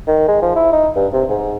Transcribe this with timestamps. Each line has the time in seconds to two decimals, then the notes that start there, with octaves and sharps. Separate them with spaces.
0.07 D#3
0.28 G#3
0.42 F3
0.56 E4
0.73 D#4
0.96 G2
1.13 C3
1.29 G#2